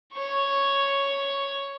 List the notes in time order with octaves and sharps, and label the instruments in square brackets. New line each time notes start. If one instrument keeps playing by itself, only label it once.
[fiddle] C#5 C#6